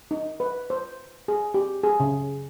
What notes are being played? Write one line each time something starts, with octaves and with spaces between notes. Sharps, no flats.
D#4
B4
C5
G#4
G4
G#4
C#3